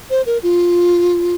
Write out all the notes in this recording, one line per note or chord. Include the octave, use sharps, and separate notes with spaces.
C5
A#4
F4